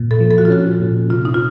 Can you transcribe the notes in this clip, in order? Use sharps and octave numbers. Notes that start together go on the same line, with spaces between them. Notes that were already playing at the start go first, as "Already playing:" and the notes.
Already playing: A#2
A4
F3
A4
F#4
F4
C#4 F#4
A#2
C3 F4
D#4
F4